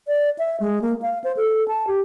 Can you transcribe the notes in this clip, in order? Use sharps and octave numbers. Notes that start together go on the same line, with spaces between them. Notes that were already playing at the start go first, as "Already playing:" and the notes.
D5
E5
G#3
A#3
F5
C5
A4
A5
G4